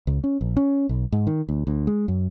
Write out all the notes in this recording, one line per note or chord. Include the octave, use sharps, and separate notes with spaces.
C#2
C#4
A#1
C#4
B1
G#2
D#3
D2
D2
G#3
F#2